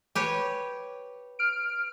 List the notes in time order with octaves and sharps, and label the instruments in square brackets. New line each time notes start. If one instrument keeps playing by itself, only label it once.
[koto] G4 B4 C#5
[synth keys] F6 D7